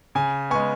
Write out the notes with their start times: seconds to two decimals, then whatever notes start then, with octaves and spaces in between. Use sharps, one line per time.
0.15 C#3 G#5
0.50 G#3 B3 G#5 C#6